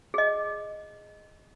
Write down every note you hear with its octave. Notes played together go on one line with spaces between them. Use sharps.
G#4 D#5